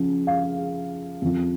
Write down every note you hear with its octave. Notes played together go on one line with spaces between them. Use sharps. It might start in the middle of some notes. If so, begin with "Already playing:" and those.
Already playing: C#3 F3
F5
F2 F3